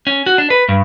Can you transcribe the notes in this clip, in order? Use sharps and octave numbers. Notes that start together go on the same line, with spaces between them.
C#4
F#4
D4
B4
G2